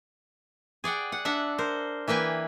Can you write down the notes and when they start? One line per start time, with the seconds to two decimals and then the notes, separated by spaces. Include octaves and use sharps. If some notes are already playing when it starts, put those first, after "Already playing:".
0.84 G#4 D5 F#5 G5
1.12 F#5
1.25 D4 E5 F#5
1.58 A#4 C5
2.08 E3 A#3 B4 G5 G#5